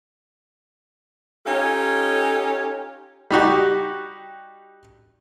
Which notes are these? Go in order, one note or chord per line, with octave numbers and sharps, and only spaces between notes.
C#4 D#4 F4 G4 A4 C#5
G3 D#4 F#4 G4